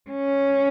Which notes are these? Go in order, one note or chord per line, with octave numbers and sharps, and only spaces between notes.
C#4